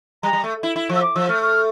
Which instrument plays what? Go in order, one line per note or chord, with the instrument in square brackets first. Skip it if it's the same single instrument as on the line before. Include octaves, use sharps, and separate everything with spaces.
[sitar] G3 [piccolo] A#5
[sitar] G3
A3
E4
E4
F3
[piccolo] E6
D6
[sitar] F3 [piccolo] E6
[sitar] A3 [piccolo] F6
[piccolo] F6